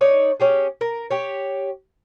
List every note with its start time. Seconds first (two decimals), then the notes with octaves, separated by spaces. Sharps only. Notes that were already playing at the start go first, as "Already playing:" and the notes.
0.01 D#4 C#5 D5
0.40 C#4 G4 G#4
0.81 A#4
1.10 G4 C#5